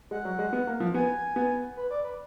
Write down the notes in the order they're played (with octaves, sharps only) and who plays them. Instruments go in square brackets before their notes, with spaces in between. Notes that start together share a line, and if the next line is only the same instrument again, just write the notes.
[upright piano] G#3 [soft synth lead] F#5
[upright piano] F#3
G#3
B3
A#3
F3
[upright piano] B3 [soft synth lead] G#5
[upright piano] B3
[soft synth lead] B4
D5
B4